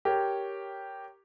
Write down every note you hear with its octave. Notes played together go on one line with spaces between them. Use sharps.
G4 A#4 C#5